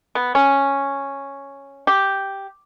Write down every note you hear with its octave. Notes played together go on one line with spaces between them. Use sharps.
B3
C#4
G4